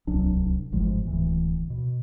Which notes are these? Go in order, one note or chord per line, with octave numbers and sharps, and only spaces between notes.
D1 C2 F#3 D4
G1 G#2 F3 G#3
D1 D2 E3
B2